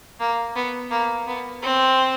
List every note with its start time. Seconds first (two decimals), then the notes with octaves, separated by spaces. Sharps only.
0.20 A#3
0.56 B3
0.91 A#3
1.27 B3
1.62 C4